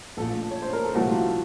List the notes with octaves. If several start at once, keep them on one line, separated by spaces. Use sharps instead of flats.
A#1 A#2 A3 A4
C#5
C5
A#4
A4
C2 A#2 F3 A3 F#4
F4